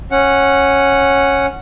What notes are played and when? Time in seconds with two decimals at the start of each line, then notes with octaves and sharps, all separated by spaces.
0.11 C#4 F#5